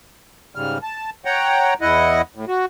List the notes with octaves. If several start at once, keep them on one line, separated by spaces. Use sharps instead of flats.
G#2 C#3 G3 F6
A5
C#5 F#5 G5 A#5
E2 E4 D#5 F#5
A2
F#4